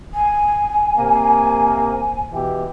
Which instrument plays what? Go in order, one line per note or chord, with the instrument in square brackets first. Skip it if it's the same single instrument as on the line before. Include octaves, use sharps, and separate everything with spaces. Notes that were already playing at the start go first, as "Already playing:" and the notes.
[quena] G#5
[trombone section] C3 A#3
B2 E3 G4